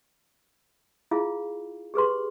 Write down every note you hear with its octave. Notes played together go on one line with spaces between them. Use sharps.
E4 F4 G#4 F5
G4 G#4 B4 C6